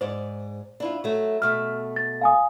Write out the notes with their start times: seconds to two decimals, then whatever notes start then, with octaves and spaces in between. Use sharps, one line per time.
0.01 G#2 C5 D5
0.80 D4 E4 F4
1.04 F#3 A3
1.42 B2 A3 E5 F6
1.96 A6
2.21 F5 G#5 D#6